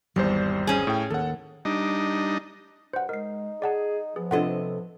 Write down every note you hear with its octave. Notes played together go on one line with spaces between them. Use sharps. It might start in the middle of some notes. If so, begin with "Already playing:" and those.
G#1 E2 G3 C5
C#4 G#4
A2 G5
D#2 A4 F#5
G3 D4 D#4 D#5
G2 C5 F#5
G#3 D#4 A#4 C7
G#4 D5 F#5 A5
F3 B3 G#4
C3 D4 F4 A4 D#5 F#5